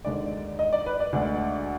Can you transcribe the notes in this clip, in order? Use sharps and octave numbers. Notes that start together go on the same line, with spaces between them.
D#2 D3 G#3 D4 D5
D#5
D5
B4
D5
D2 D3 G#3 D4